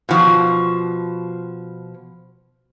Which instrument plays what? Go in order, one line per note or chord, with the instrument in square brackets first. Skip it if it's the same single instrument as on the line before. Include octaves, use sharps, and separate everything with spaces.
[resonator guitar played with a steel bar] B2 F3